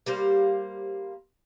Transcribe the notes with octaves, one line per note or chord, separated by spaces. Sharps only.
G3 A#3 C5